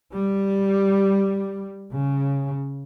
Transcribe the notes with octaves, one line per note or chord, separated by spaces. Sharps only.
G3
C#3